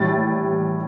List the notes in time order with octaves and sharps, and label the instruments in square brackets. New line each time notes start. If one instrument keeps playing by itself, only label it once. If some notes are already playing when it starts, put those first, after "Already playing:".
Already playing: [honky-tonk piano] A2 E3 G3 A6